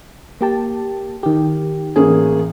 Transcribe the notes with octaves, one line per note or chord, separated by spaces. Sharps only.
A#3 G4 A5
D#3 G4
A1 A#3 G#4